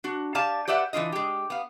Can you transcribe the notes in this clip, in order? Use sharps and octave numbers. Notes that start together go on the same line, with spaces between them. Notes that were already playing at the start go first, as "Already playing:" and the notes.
D4 F#4
G4 D5 F5 G#5 A5
G4 B4 D5 E5 F#5
E3 A3 D4 F4 D#5
G#3 G4
B3 F5